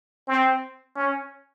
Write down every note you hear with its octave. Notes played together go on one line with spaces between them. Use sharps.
C4
C#4